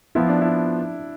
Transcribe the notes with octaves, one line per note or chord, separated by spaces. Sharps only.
F3 B3 E4 F4
D4
E4